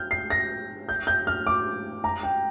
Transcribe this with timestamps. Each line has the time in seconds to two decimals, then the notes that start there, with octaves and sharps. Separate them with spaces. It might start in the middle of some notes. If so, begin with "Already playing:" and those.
Already playing: F6 G6
0.11 C7
0.30 A#6
0.89 G6
1.07 G6
1.27 F6
1.47 D6
2.04 A#5
2.23 G5